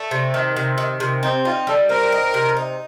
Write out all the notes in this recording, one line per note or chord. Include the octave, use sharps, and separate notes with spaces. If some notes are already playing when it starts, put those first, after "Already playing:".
Already playing: A3
C3
D#3
C3
D#3
C3
C4 D#4
D#4 F4
G3 A4
C4 A#4
D#4
C3
D#4